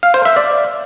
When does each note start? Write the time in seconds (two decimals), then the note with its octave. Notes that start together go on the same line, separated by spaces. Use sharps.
0.03 F5
0.14 C5
0.25 E5
0.37 D5